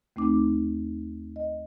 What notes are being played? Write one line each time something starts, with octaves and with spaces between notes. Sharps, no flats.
D#2 A3 C4 D#4 D6
D#5